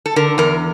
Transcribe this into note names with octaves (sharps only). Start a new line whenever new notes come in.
A4
D3 A#4
E2 A#4